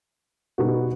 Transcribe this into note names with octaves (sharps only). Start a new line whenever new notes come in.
B2 G3 B3 D#4 F#4